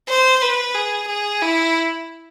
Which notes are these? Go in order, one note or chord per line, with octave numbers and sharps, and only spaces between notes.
C5
B4
G#4
G#4
E4